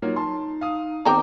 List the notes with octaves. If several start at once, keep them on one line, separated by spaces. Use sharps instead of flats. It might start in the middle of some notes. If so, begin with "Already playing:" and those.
F#3 A#3 D#4 F4
A5 C6
F5 D#6
D#3 B3 C4 G#4 A#4 G5 A#5 D6